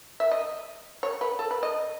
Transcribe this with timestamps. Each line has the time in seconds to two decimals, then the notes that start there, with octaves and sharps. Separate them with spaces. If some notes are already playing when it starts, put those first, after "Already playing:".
0.20 E5
0.32 D#5
1.03 C#5
1.21 B4
1.39 A4
1.51 B4
1.63 D#5